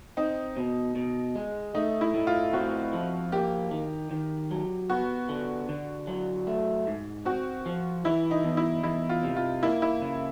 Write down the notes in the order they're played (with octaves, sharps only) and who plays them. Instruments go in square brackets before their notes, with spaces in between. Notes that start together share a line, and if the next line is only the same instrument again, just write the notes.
[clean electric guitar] C4 [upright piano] D#4
[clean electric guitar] B2
B2
G#3
[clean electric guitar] A3 [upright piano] D#4
[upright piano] E4
[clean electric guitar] A2
[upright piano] F4
[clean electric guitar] C4 [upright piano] F#4
[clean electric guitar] F3
[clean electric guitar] A#3 [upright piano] G4
[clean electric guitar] D#3
D#3
F#3
[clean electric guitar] B3 [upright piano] F#4
[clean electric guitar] D3
D3
F#3
A3
G#2
[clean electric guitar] C4 [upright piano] F#4
[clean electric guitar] F3
[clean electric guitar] E3 [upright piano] E4
[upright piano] D#4
[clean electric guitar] E2
[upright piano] E4
[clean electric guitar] E2 [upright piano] E4
[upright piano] F4
[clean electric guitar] C3
[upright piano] F4
[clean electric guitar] A#3 [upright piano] E4
[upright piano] E4
[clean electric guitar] C#3